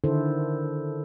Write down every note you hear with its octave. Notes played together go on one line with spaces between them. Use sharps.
D3 D#3 E4 A4 C5